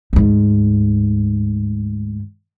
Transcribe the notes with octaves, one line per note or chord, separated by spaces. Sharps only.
D2 G#2